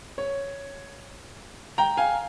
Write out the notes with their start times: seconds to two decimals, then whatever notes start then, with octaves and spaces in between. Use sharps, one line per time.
0.18 C#5
1.78 G5 A#5
1.97 F5 G#5